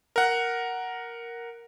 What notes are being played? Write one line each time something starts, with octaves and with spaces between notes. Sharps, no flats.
A#4 F#5